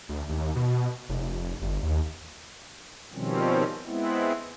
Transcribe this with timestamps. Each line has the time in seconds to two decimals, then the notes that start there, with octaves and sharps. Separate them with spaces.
0.09 D2
0.29 D#2
0.56 B2
1.09 F1
1.62 G1
1.83 D#2
3.13 B2 D#3 F3 G3 C4 C#4
3.85 G#3 B3 C4 E4